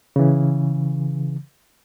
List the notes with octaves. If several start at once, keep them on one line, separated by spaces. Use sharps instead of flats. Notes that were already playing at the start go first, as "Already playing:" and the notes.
C#3 E3